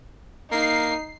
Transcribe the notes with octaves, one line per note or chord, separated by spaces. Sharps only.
A#3 D#4 C7